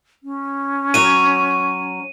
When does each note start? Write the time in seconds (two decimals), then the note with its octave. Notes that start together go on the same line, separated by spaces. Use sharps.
0.23 C#4
0.94 F#3 C#5 D#7